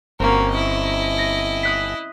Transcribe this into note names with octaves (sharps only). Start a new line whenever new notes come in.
G1 A#3 C4 C#4 F#4
E4 D#5
A#6
D#6 F#6 B6